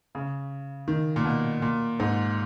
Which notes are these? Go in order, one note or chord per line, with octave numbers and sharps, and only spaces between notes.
C#3
D#3
A#2
B2
A#2
G#2